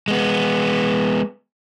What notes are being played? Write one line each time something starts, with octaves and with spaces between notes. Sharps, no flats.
G#3 B3